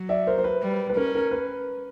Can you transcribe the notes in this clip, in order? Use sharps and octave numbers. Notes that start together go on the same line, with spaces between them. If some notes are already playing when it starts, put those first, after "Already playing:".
Already playing: F#3
D5 E5
A#4 C5
C5
B4
G3
B4
C#4 A#4
A#4
B4